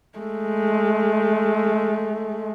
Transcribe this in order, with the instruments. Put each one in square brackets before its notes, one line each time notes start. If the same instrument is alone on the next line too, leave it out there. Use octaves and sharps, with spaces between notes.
[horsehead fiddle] G#3 A3